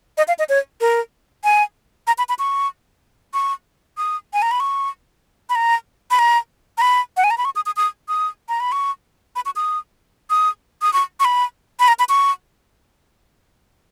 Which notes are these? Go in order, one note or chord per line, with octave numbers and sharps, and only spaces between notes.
D#5
F5
D#5
C#5
A#4
G#5
A#5
B5
B5
C#6
C#6
D#6
G#5
A#5
B5
C#6
B5
A#5
B5
A#5
A#5
B5
F#5
G#5
A#5
B5
C#6
D#6
D#6
D#6
D#6
A#5
B5
C#6
B5
C#6
D#6
D#6
D#6
C#6
C#6
B5
B5
A#5
B5
C#6